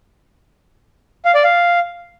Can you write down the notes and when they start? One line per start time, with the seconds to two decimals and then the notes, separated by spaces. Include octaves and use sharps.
1.25 F5
1.35 D5
1.44 F5